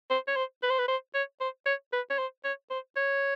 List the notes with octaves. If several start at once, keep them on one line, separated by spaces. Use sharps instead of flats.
C5
C#5
C5
B4
C5
B4
C5
C#5
C5
C#5
B4
C#5
C5
C#5
C5
C#5